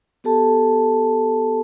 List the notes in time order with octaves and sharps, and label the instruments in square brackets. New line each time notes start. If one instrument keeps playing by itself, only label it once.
[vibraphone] B3 G4 A4 A5